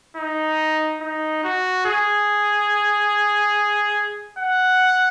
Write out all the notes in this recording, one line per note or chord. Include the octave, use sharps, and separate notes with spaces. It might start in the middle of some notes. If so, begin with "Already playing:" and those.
D#4
D#4
F#4
G#4
F#5